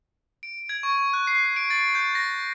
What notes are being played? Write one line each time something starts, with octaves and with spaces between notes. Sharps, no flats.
D7
G#6
C#6
F#6
C7
D7
A6
G6
A#6